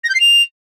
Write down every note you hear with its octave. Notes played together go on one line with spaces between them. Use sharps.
A#6
G6
C7
F7